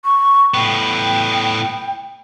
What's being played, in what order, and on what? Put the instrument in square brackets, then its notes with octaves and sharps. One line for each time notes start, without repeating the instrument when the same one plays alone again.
[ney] C#6
[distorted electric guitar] A2 B3 [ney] G5